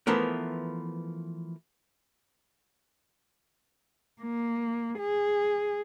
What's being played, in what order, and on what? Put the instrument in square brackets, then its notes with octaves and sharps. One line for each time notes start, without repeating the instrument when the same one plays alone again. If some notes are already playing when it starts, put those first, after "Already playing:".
[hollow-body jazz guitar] E3 F3 A3 B3 A#4
[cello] A#3
G#4